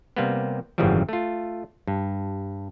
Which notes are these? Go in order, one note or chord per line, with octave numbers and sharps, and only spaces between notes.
C3 G3 A#3 B3
G#1 F#2 C#3 E3 F3 G3
A3 F4
G2